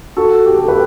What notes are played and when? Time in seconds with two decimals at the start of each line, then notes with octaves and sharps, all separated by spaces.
0.17 F#4 A4
0.46 G4
0.57 A4
0.68 G4 B4